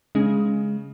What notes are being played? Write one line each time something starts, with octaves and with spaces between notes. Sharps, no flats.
C#3 G#3